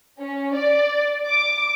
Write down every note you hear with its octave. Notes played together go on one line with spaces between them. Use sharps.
C#4
D5
D6